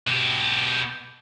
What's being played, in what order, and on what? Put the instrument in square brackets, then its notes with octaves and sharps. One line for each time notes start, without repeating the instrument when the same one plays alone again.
[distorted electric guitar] B2 G4